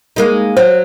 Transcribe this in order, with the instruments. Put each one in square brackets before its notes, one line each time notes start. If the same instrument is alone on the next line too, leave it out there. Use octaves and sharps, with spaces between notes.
[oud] G#3 A#3 D#4
[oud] F#3 [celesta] C5